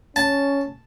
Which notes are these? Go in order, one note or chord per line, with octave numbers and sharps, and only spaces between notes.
C#4 A5